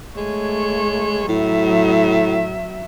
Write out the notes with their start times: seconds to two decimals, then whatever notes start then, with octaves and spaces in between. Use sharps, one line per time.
0.17 G#3 A3 C#5
1.29 A2 F#3 E5